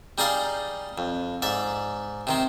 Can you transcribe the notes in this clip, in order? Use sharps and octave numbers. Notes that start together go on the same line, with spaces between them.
G3 D#4 G#4 D5 F5
F2
G#2 D5 E5
C3 D#3 C4